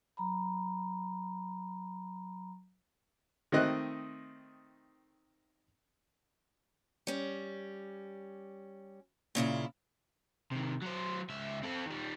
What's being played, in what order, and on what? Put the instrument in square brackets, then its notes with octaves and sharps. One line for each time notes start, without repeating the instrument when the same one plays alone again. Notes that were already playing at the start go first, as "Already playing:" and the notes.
[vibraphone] F#3 A#5 B5
[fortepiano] D#3 A3 C4 D#5 F#6
[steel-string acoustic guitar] G3 C#4
A#2 C#3 E4 F4
[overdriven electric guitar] C3 D#3
F#3 C5
C#2 E5
C4 A4
D#3 G3